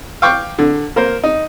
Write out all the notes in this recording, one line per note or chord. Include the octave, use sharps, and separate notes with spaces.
F5 G5 C#6 D6
D3
A#3 A#4 C5
D#4